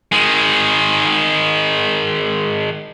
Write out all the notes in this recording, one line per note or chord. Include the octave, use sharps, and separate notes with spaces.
D#3 G#3